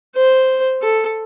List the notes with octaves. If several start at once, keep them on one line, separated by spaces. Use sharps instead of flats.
C5
A4